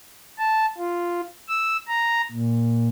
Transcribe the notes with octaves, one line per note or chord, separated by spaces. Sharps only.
A5
F4
E6
A#5
A#2